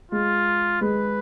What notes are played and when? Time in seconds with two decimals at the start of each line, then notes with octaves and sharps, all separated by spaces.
0.12 G#3 F4
0.81 G#3 B4